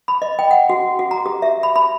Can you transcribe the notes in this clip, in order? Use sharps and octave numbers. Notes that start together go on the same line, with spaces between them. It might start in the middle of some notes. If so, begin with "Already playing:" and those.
B5
D#5
G5
F#5
F#4
F#4
A#5
G4
E5
B5
B5